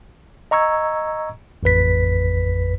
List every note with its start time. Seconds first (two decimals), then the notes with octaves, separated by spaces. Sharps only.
0.51 D#5 A#5 C#6 E6 G#6
1.63 A1 F2 B4 B6